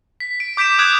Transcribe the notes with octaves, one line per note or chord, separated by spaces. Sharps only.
B6
D7
D6 G6 B6 D7 E7
D6 D#6 F#6 G#6 E7